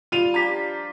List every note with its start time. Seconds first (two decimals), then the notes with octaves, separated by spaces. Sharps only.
0.12 G3 F4 D#7 F7
0.34 F3 D4 G4 A#5 B6